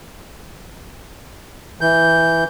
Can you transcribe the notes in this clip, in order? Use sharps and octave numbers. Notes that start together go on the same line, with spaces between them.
E3 G6